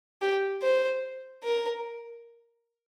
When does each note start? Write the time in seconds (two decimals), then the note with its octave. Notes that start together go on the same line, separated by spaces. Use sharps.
0.22 G4
0.63 C5
1.44 A#4